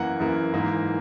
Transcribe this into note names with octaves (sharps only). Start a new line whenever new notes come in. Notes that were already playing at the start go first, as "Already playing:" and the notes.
Already playing: F#2 E3 A#3 F#5
F#2 E3 A#3
G#2 E3 A#3